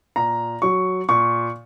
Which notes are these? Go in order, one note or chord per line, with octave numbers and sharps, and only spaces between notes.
A#2 A#5
F#3 C#6
A#2 C#6